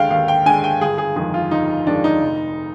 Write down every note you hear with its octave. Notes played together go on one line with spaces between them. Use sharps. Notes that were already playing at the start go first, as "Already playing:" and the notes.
Already playing: D#2 D3 G#3 F5 G5
D#2 F5
G5
D3 G#3 G#5
G5
G1 G#4
G#4
F2 D#3 G#3 G#4
F4
G1 D#4
F2 D#3 G#3 D4
D#4
F1